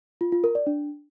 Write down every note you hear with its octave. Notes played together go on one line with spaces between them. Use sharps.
F4
F4
A#4
D5
D4